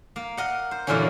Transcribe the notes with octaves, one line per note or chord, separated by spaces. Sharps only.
A#3
A#4 D#5 F#5
C5
F#2 A#2 D3 E3 A#3 C#4